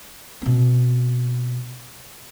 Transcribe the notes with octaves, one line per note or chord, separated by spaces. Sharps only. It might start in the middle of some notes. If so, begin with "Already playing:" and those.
B2 C4